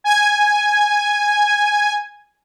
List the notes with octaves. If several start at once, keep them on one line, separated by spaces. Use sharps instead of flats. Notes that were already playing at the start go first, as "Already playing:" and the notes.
G#5 G#6